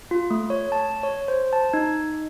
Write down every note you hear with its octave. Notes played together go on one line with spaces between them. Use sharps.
F4
A3
C#5
A5
C#5
C5
A5
D#4